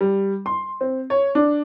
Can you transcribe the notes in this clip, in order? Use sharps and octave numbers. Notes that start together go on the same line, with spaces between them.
G3
C6
C4
C#5
D4